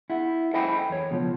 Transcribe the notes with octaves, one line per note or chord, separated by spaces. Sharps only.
E4 F#5
A4 C5 D#5 G5 G#5 B5
E2 C#5
C#2 B2 D#3 F3